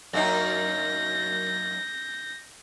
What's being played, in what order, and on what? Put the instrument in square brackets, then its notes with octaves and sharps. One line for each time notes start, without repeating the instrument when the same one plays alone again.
[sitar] F#2 A#3 D#4 [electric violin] G6 A#6